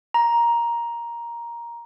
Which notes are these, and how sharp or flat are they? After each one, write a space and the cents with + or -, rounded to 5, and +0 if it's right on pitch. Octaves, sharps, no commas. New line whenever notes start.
A#5 +10